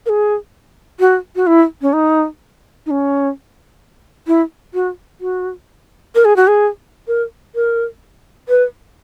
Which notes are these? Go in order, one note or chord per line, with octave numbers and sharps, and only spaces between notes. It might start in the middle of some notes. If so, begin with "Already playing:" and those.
A#4
G#4
F#4
F#4
E4
C#4
D#4
D#4
C#4
E4
F#4
F#4
A#4
G#4
F#4
G#4
A#4
A#4
B4